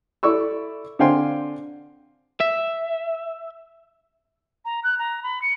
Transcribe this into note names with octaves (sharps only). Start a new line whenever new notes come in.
E4 A4 D5 C#6 E6
D3 C4 F5 G5 G#5 C6
E5
A#5
F#6
A#5
B5
C#7